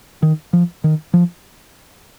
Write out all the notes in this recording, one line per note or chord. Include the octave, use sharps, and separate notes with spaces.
D#3
F3
D#3
F3